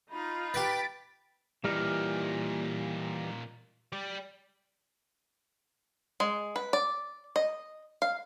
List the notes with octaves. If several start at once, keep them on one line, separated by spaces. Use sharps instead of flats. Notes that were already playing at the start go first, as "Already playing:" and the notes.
D#4 F4 B5
G4 B4 A6 B6 D7
A#2 E3 G3 D#4 A#4
G3 D5
G#3
B4
D5
D#5
F5